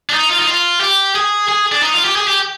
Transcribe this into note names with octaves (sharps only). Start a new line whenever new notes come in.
D4
D#4
F4
D#4
F4
G4
G#4
G#4
D4
D#4
F4
G4
G#4
G4